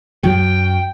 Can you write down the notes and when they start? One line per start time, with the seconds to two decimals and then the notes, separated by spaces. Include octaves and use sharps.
0.23 F#2 F#3 G5